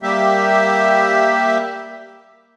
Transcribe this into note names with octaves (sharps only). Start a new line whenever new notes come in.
G3 A#3 G4 E5